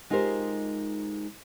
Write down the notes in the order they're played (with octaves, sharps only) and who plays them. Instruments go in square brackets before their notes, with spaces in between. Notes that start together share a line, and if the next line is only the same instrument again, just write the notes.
[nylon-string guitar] G#3 D#4 F4 G4 A#4 C5